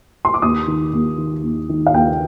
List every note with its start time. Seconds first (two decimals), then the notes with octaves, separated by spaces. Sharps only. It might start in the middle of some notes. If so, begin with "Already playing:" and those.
0.25 C6
0.34 D6
0.42 D#2 D#6
0.68 D#3
0.93 D#2
1.18 D#3
1.43 D#2
1.69 D#3
1.87 F5
1.94 D#2 G5